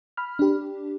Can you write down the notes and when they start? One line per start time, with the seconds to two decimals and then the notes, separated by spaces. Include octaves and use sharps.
0.17 B5 F6
0.39 D4 G4